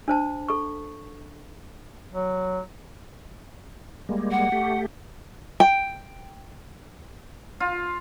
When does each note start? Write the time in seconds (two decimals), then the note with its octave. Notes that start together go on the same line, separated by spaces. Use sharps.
0.08 D4 C5 A5
0.48 A4 C#6
2.14 F#3
4.09 G3 G#3 A#3
4.31 F#5
4.52 A3 G4
5.60 G5
7.60 F4